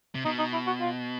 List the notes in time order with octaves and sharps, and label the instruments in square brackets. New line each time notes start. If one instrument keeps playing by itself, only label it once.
[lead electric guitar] C3
[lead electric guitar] B2 [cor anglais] D#4
[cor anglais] D#4
E4
F#4
F4